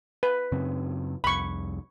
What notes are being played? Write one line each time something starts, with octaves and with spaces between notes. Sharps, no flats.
B4
F#2 C#3 C4
C2 F2 B5 C#6